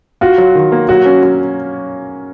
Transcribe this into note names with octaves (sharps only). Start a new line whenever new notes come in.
F4 F#4
F#3
D#3
A#3
F#3 F#4
C#4
F#3